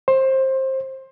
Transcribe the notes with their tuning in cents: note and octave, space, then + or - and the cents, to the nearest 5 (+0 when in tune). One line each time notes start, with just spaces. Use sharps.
C5 +20